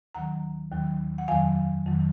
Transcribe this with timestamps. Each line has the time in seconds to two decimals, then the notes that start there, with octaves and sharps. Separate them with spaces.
0.15 D#2 D#3 F#3 F#5 A#5
0.72 D#2 D#3 F#3
1.18 F#5
1.28 F2 D#3 F#3 F5 G#5
1.86 F2 D#3 F#3